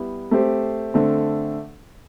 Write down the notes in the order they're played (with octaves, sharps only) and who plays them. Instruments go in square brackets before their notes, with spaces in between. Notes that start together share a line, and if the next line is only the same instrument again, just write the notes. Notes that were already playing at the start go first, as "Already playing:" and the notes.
Already playing: [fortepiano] G3 B3 E4
A3 C4 G4 C5
D3 A3 C4